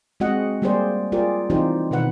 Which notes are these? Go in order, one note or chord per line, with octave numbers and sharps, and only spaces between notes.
G#3 C4 F#4 D#5 F#5
G3 A#3 G4 G#4 C5 D5
F4 G4 G#4 A#4 D5
E3 C4 D#4 F4 G4 C5
B2 D#3 B4 F#5